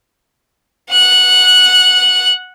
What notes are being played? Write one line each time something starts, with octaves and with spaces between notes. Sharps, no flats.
F#5 F#6